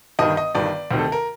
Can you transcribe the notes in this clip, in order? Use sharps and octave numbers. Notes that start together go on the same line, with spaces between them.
G1 G2 D#3 D#5
D#5
G1 G2 D#3 D5
D2 C3 D#3
A4
A#4